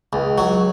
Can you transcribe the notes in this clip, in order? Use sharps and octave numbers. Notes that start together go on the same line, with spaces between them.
C#2
F#3